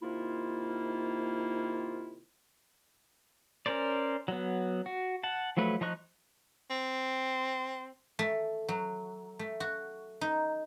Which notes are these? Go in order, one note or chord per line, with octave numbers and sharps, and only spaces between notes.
C3 D#3 A#3 E4 F4
C#4 A#4 C5 D5
F#3 B3
F#4
F#5 A5
F3 F#3 A3 B4
F3 D#4 D#5 C#6 F#6
C4
A3
F#3
A3
F#4
D#4